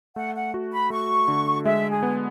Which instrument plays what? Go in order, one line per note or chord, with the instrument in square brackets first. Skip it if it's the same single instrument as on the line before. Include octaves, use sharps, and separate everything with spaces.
[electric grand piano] A3 [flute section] F#5
[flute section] F#5
[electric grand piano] F#4
[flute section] B5
[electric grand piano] A3 [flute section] C#6
[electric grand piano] D3
[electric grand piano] G#3 [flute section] E5
[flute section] G#4
[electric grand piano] B3